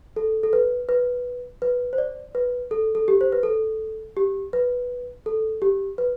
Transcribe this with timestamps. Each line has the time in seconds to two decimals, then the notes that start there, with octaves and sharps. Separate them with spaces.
0.16 A4
0.43 A4
0.53 B4
0.89 B4
1.62 B4
1.93 C5
1.98 D5
2.35 B4
2.71 A4
2.95 A4
3.08 G4
3.21 C5
3.32 B4
3.43 A4
4.17 G4
4.53 B4
5.26 A4
5.62 G4
5.98 B4